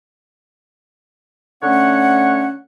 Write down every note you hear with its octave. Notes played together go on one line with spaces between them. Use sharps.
D3 A3 C#4 C#5 F#5